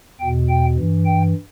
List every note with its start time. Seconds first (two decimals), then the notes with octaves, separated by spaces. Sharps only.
0.20 E2 B2 G5
0.49 G5
0.77 G2 E3
1.06 G5